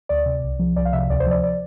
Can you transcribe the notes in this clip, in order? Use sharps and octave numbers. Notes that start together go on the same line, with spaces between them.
D2 D5
C3
C2
F3
C2 D5
F5
C3 E5
D2 D5
C5
F3 D5
D5